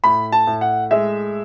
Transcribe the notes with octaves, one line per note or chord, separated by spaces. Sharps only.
A2 B5
A5
A2
F#5
G#3 E5